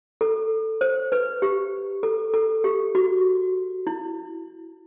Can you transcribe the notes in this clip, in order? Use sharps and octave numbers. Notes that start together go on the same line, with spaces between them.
A4
C5
B4
G4
A4
A4
G4
F#4
E4